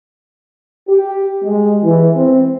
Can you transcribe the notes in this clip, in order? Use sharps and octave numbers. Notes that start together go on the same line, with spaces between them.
G4
G#3
E3
C4